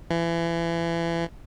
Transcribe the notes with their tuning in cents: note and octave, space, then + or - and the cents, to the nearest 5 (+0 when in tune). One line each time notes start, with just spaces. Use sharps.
E3 +30